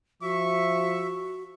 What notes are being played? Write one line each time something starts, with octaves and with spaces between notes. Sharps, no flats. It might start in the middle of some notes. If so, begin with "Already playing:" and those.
F3 F#4 E5 C#6